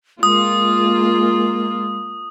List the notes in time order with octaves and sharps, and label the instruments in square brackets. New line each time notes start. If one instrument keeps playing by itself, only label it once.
[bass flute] G#3 [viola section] A#3 F4 [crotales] D#6